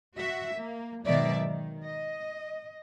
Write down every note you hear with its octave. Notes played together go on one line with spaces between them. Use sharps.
F#4 E5
A#3
G#2 B2 D#3 F#3 D5 E5
D#3
D#5